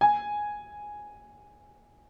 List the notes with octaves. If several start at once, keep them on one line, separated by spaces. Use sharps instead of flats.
G#5